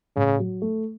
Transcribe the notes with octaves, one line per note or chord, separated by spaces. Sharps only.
A2 C#3
F#3
A3